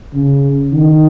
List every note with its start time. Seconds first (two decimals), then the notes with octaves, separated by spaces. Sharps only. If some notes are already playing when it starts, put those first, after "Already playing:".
0.14 C#3
0.72 D#3